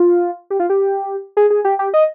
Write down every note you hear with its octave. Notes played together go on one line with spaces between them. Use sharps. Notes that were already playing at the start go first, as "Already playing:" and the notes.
Already playing: F4
G4
F4
G4
G#4
G#4
G4
G4
D#5